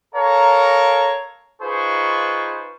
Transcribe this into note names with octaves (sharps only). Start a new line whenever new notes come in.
A4 A#4 C#5 F5 A#5
D#4 F4 G#4 B4 C5 C#6